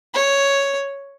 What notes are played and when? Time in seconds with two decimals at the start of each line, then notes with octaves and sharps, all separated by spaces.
0.14 C#5